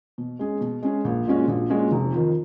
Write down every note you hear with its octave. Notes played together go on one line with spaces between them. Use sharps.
B2
G#3 C#4 G#4
B2
G#3 C#4 G#4
A#1
A#2 G#3 C#4 F#4
A#1
A#2 G#3 C#4 F#4
F1
F2 D#3